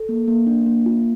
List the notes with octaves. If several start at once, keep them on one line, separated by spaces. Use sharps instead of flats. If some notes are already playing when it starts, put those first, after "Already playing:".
Already playing: A4
A#3
A#3
D4
A#3
F4